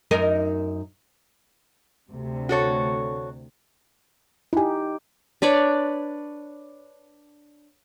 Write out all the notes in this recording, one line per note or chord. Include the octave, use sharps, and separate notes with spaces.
F#2 D#4 A#4
D2 C3
F#4 A4 C#5
D#4 E4 G4 G#5
D4 B4 C#5 D5